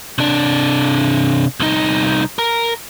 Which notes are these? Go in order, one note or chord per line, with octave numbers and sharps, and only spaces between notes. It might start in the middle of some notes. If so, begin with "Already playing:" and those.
C3 D4
C2 D#4
A#4